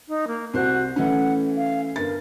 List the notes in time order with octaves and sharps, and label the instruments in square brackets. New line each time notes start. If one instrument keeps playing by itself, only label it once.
[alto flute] D#4
A#3
[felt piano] C2 C5 [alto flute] F#4
[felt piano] E3 A3 C#4 [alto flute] F#5
[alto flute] F5
[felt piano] G1 A6 [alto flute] A#4